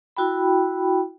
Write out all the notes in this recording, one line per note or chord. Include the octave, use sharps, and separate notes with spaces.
E4 F#4 G5 B5